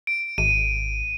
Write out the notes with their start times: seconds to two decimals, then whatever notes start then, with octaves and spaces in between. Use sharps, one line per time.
0.07 D7
0.38 G#1 D#7